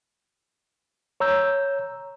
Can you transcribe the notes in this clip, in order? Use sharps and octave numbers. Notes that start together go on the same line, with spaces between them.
C#5 A#5 E6 G6